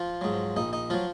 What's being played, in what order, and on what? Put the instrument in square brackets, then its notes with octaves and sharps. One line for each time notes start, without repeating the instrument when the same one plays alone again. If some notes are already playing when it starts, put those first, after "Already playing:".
Already playing: [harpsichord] F3 F4
G#2 F#3
A#1 D#4
D#4
F3 F#3 F4